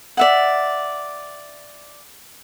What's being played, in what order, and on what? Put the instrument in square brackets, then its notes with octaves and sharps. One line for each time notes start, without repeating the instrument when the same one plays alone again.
[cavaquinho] D5 E5 F#5